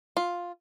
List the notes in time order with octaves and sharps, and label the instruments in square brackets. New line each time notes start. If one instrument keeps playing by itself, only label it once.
[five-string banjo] F4